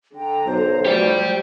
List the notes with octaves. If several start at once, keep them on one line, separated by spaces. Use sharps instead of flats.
D3 G5 A#5
B1 C5
F3 F#3 A3 G4 D5